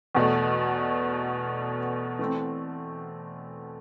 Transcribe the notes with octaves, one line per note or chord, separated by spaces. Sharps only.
E2 B2 A3
E3 A3 C4